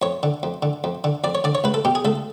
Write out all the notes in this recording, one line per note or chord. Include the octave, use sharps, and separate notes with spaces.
F2 C#5
D3
F2
D3
F2
D3
F2 D5
C#5
D3 D5
C#5
C#2 B4
A4
B2 G4
G#4
C#2 A4